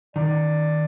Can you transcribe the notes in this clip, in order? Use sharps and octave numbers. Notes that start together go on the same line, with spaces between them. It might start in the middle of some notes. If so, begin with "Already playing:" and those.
D#3 D5